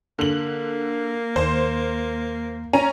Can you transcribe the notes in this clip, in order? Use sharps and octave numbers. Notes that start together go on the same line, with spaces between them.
D3 A#3 F#7
D#2 C5
C#4 A#5 D#7